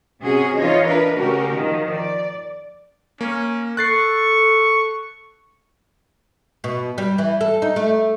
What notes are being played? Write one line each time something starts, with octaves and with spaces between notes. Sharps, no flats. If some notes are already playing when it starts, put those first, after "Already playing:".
C3 C#4 F#4 G#4
E3 D#4 F4 C#5 D#5
D4 A#4 B4 D#5
C#3 A3 F#4 G4 A#4
D#3 F3
D5
A#3 C#4
A4 C#6 F#6 A6 C7
B2
G3
E3
A4
D#4
A3